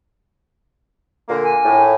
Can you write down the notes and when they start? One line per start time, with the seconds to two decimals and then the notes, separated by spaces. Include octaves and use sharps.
1.29 A#2 D3 A#3
1.44 G#5
1.65 A2